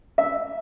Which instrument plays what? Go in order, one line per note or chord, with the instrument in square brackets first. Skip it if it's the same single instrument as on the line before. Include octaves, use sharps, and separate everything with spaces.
[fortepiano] E5